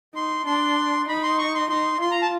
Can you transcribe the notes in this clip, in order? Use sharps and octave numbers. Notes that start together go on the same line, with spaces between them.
D#4 C6
D4 C6
D#4 B5
C6
C#6
C6
D#4 C6
F4 C6
A#5
A5